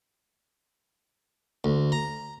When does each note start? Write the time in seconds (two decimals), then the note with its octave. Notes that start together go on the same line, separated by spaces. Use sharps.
1.64 D2
1.92 A#5